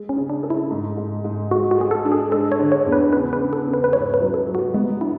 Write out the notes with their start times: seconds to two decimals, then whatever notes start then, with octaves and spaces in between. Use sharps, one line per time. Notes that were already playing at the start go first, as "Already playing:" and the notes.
Already playing: G#3
0.09 C#4
0.16 C#3
0.30 D4
0.43 A4
0.50 E4
0.70 G#2
0.97 G#2
1.24 G#2
1.51 G#3 F#4
1.71 F#4
1.78 G#3 G#4
1.91 A4
2.05 D4
2.12 G#4
2.32 G#3 A4
2.52 C#5
2.59 D3
2.72 C#5
2.86 E2
2.92 B4
3.13 C#3 B4
3.33 B4
3.40 C#3
3.53 A4
3.67 C#3
3.74 B4
3.84 B4
3.93 G#2 C#5
4.14 B4
4.21 F#3
4.34 A4
4.48 F#3
4.55 F#4
4.74 G#3 B3
5.01 D4 E4